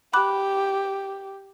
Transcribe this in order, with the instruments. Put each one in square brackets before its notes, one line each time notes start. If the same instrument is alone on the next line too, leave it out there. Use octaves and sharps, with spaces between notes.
[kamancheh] G4 [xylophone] B5 D6 F#6